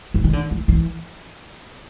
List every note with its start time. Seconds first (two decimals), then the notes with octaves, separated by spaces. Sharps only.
0.14 C#3
0.24 D#3
0.33 D3
0.51 E3
0.68 E3